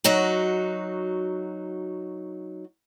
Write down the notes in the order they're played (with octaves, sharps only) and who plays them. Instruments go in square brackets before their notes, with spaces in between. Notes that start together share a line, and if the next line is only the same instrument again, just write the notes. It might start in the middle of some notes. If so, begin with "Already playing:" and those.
[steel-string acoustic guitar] F#3 D#4 F#4